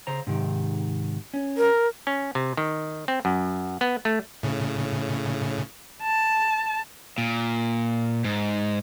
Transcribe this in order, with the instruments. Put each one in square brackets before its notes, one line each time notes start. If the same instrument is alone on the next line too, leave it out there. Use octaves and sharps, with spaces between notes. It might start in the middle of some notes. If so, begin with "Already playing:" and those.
[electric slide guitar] C#3 C5 A#5
G#2 C3 D#3
C#4
[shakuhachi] A#4
[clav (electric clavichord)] C#4
C3
D#3
C4
F#2
B3
A3
[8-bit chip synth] A2 C#3
[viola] A5
[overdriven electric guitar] A#2
G#2